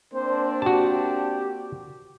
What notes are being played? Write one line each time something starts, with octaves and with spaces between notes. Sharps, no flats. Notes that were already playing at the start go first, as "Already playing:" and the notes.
A#3 C4 D4 C5
F#4 G4 A5